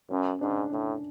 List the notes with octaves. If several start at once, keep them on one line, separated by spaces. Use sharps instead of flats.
F#2 C#4
G#2 D4
A2 D4